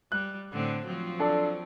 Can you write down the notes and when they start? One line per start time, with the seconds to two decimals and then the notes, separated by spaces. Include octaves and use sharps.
0.12 G3 F#6
0.52 A2 D3 C4
0.86 F3 F#3 C4
1.19 D4 A4 D5